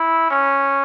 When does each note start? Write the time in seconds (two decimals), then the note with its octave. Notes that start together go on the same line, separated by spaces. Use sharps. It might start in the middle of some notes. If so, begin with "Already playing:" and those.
Already playing: E4
0.31 C#4